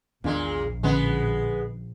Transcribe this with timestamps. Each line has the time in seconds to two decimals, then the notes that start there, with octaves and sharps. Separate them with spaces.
0.24 A#1 E2 A#2 D#3 G#3 D4
0.83 A#2 D3 G#3 B3 C#4